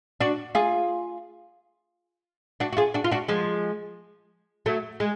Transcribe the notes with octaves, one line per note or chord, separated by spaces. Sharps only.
D4 F#4
F4 G#4
D4 F#4
F#4
F4 G#4
D4 F#4
F4
D4 F#4
F3 G#3
F#3 A3
G#3